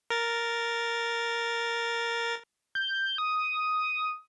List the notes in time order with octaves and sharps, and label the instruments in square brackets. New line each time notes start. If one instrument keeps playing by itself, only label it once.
[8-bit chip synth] A#4 A6
[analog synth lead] G6
D#6